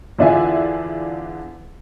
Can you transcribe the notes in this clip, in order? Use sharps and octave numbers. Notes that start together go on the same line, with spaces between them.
E2 D3 D4 F4 E5 G#5